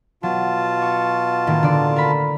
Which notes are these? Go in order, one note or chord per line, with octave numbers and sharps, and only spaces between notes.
B2 F#3 F4 A5
C#6
A2 D#3 A#3
D3 D5
A#4 B5